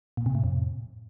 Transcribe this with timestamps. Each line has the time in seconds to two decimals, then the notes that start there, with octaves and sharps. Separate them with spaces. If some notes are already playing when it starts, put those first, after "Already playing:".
0.17 A#2
0.26 C3
0.35 A2
0.44 F2